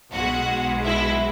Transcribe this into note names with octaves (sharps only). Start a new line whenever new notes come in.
B1 B2 G#3 F#4 F#5
E4 E5